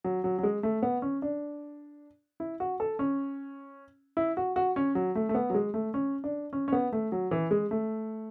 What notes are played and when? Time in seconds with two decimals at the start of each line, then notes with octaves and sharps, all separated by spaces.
0.05 F#3
0.24 F#3
0.39 F#3
0.43 G#3
0.63 A3
0.83 B3
1.02 C#4
1.22 D4
2.40 E4
2.60 F#4
2.80 A4
2.99 C#4
4.17 E4
4.37 F#4
4.56 F#4
4.76 C#4
4.95 F#3
5.15 A3
5.29 A3
5.35 B3
5.50 F#3
5.54 G#3
5.74 A3
5.94 C#4
6.24 D4
6.53 C#4
6.68 C#4
6.72 B3
6.93 A3
7.12 F#3
7.31 E3
7.51 G#3
7.71 A3